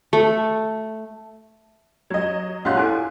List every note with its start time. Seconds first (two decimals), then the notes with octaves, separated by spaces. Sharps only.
0.13 A3
2.10 F#3 D#5 G#6
2.65 A#1 C#5 F5 F#5 C6 F#6
2.77 E4 A4 G#5